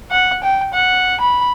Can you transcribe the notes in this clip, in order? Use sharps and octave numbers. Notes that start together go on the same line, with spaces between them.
F#5
G5
F#5
B5